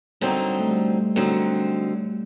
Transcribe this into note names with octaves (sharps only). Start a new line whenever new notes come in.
D3 F#3 G3 C4 D#4
A3
G3
D3 F#3 C4 D#4